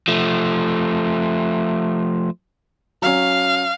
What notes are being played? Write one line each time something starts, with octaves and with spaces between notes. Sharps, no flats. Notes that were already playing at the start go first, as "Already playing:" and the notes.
F3 A3
F#3 C#4 F5